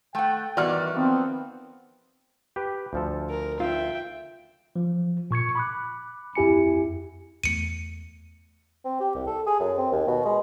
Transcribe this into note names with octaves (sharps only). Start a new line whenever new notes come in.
A3 F#5 G5
E2 D#3 G3 B3 F#4 D5 F6
D#3 F3 B3 C4
G4 B4
D2 F3 A4
A#4
F4 E5 G5
F3
A#2 C#6 G#6 C#7
B5 D6 F#6
F2 E4 G4 G#5 C#7
E2 A3 C#7 D#7
C4
G4
C2
A4
G#4
F#2
C4
D#2
B2
G#3